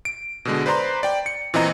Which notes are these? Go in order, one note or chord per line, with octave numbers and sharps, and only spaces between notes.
D7
B2 D3 G#3
B4 C5 D5 A#5 C6
D5 G5
C#7
A#2 E3 C4 D#5 A#5